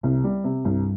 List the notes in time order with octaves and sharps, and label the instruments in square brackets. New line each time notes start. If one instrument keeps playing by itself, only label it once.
[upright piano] C2 [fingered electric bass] C3
[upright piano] G3
C3
[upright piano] C2 [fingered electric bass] G2